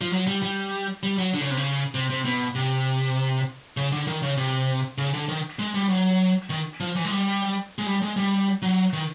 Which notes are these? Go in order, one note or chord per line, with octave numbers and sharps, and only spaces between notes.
F3
F#3
G3
G3
G3
F#3
D3
C#3
C3
C#3
C3
C3
B2
C3
C#3
D3
D#3
C#3
C3
C#3
D3
D#3
G#3
G3
F#3
D#3
F3
E3
G#3
G3
G#3
G3
G#3
G3
F#3
D#3